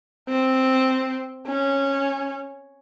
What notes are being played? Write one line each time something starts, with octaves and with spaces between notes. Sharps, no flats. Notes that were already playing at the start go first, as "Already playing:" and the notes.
C4
C#4